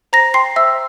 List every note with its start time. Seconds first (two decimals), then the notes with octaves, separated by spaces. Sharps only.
0.13 C5 A#5 A#6
0.34 G5 C6 C7
0.56 C5 E5 E6